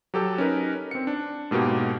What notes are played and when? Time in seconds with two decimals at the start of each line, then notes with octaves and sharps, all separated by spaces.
0.14 F#3 G4 A4 A5
0.38 C#4 D#4 A#4 B4
0.91 C4 C#7
1.07 D4
1.51 G#2 B2 A#3 F#4 G4